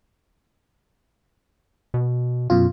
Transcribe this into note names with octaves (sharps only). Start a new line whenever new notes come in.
B2
F#2 B2 F4